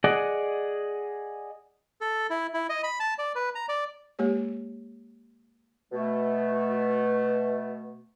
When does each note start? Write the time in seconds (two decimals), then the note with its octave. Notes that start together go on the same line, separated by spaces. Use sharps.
0.04 G#4 D5 D#5 F#5
2.01 A4
2.30 E4
2.54 E4
2.69 D#5
2.84 B5
3.00 A5
3.18 D5
3.35 B4
3.55 A#5
3.69 D5
4.19 G#3 A#3 G4 C#5
5.92 B2 A3